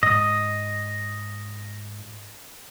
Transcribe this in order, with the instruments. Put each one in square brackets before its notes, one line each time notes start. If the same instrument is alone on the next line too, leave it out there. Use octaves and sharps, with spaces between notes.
[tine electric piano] G#2 [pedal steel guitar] D#5